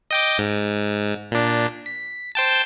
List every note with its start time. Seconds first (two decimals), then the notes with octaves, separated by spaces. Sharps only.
0.11 D#5 G5 D6
0.38 G#2
1.31 A#2 D4
1.86 B6
2.35 C5 G5 A5